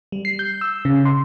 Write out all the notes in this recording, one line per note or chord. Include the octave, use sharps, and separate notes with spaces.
G3
C7
G6
E6
C#3
C6